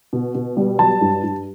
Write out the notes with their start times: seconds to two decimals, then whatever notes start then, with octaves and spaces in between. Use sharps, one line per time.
0.13 B2
0.35 B2
0.57 G3
0.79 F#3 A5
1.01 G2
1.23 G2